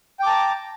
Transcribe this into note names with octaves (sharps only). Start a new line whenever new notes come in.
G5 A5 A#5 D6